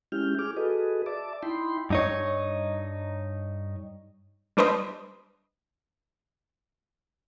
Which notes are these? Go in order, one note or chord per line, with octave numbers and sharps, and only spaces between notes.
G#3 C#4 E4 G4 F6 G6
G#4 D6 F6
F#4 G#4 A4 B4 D#5
D5 E5 A5 D6
D#4 E4 G5 B5 C6
G2 D#4 C#5
G3 D4 B4 C5 D#5